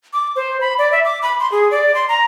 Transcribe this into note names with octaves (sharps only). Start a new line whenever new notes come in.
D6
C5
B5
D5
E5
D6
B5
C6
G#4
D5
C6
A#5